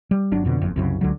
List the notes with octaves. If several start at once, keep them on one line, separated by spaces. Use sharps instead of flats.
G3
G1 F#3 D4
F2 B2 D3
F#1 F2
C2 F#2 C#3
C#2 D3 F#3